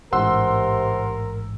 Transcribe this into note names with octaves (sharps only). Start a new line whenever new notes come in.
A1 G#2 C3 A#4 F#5 C6 E6